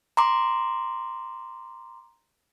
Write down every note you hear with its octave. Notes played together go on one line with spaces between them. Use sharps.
A#5 C6 D6